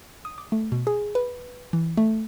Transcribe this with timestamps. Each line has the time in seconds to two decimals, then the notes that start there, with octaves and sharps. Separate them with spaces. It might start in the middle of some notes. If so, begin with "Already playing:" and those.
0.25 D#6
0.38 D6
0.52 A3
0.72 B2
0.87 G#4
1.15 B4
1.73 E3
1.97 A3